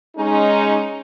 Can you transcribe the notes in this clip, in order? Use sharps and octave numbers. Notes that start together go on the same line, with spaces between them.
G#3 C#4 D#4